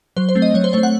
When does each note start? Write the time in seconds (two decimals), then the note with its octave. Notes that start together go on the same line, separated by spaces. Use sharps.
0.16 F#3 C5
0.29 C5
0.35 A3 C4
0.42 D#5
0.54 F#3 C#5
0.64 C5
0.73 A3 C4 C#5
0.83 F#5